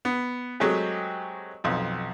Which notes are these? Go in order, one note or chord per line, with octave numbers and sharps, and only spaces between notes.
B3
F#3 G#3 A3 C4 G4 G#4
B1 F2